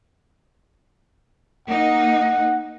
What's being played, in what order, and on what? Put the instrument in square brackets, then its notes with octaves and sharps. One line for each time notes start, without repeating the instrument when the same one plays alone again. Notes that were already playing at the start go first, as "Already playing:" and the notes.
[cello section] A#3 D#4 [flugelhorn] F#5